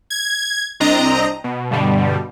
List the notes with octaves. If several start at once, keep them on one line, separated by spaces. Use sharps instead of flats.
G#6
C2 C4 D4 D#5 A#5
B2
G2 B2 D3 G3